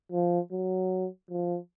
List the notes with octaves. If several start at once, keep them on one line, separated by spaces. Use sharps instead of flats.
F3
F#3
F3